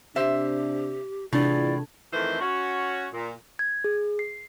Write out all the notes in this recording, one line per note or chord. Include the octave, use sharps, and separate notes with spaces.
C3 D4 G4 C5 E5
A2 C3 E3 D4 F4 G#4 D5
F2 D#3 E3 A3 C5
C#4 F#4
A#2
G#6
G#4
C7